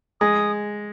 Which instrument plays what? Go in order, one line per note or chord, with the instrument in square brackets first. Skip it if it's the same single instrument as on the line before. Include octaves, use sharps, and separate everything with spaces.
[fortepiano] G#3 [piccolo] D#6